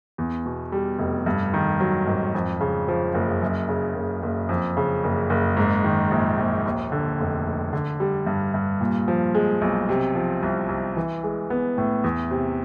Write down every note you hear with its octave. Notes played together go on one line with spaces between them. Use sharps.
E2
B2
G3
F1
G2
D#3
F#3
G#1
F2
C#3
F3
F#1
F#2
C#3
F#1
F#1
F2
C#3
F#1
F#1
G#2
D#3
A#1
A#1
D#2
D3
F1
F1
D3
G3
G2
G2
A#2
F3
G#3
B1
C3
F3
C2
C2
E3
G#3
B3
A2
E2
C3